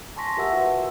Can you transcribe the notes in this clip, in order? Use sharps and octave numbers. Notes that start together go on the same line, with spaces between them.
G#5 A5 C6 C#6 A#6 B6
F4 G4 A#4 E5 F#5 E6
F4 F#4 B4